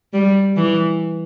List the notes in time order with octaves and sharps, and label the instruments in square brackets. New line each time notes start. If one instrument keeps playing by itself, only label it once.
[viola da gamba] G3
E3